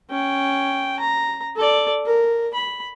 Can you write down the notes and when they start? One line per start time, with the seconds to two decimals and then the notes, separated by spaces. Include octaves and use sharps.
0.10 C#4 G5
1.00 A#5
1.56 A4 D5
2.06 A#4
2.54 B5